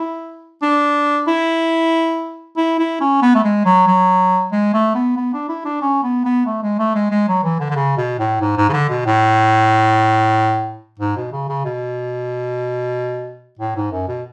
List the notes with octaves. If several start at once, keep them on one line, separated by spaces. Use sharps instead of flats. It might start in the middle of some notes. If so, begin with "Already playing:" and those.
Already playing: E4
D4
E4
E4
E4
C#4
B3
A3
G#3
F#3
F#3
G#3
A3
B3
B3
D4
E4
D4
C#4
B3
B3
A3
G#3
A3
G#3
G#3
F#3
E3
D3
D3
C#3
B2
A2
G#2
G#2
C#3
D3
B2
A2
G#2
B2
C#3
C#3
B2
A2
G#2
F#2
B2